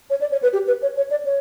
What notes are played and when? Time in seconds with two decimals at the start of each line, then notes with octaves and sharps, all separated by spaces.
0.10 C#5
0.21 D5
0.31 C#5
0.42 B4
0.53 G4
0.67 B4
0.82 C#5
0.97 C#5
1.11 D5
1.25 C#5